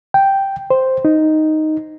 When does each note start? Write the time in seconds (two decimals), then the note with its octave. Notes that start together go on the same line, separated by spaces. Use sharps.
0.14 G5
0.70 C5
1.05 D#4